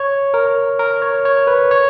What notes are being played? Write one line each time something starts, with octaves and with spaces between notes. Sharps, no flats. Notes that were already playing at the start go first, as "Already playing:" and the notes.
Already playing: C#5
A#4
A#4
C#5
C#5
B4
C#5